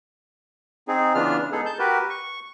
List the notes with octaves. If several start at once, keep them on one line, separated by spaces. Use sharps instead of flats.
C4 D#4 G#4
C#3 E3 B3 D4 F4 F6
G#3 B3 D#4 G#4 A4
A5 G6
F#4 G4 A#4 B4
C#6